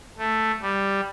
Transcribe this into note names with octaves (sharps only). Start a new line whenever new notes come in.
A3
G3